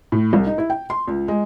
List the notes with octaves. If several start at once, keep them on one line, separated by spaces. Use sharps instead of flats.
A2
C2
D#4
E4
G5
C6
C#2
G#3